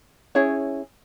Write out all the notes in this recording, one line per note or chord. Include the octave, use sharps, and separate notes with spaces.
C#4 E4 G#4 C#5